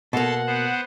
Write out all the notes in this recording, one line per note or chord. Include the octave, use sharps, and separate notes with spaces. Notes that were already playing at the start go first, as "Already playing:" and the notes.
B2 A#3 A4 F#5 A5 C6
B3 C5